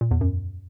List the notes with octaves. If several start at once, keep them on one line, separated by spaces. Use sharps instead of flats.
A#2
E2
F#2